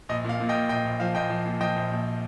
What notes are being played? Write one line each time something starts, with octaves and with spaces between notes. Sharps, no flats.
A#1 D#5
A#2
F5
A#2
D#5 G5
A#2
A#1 D#5 G5
A#1
F3 F5
A#1 D#5 G5
F3
A#2
F3 D#5 G5
A#1
A#1